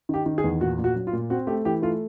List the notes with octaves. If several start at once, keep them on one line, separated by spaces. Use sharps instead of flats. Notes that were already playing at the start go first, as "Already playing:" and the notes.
D#3 G4
D#3
G#4
E2
A#2 F#4
A#2
F#4
F#3
F4
A#2
C4 F#4
A3 G4
E3 G4
A3 F4